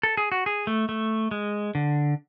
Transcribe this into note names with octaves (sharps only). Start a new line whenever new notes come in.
A4
G#4
F#4
G#4
A3
A3
G#3
D3